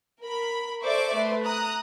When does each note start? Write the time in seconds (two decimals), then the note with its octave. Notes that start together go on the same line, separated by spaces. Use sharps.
0.22 A#4 B5
0.84 A4 C5 D5 E5 C#6 D6
1.15 A3 B4 C6
1.44 A#5 D#6 F#6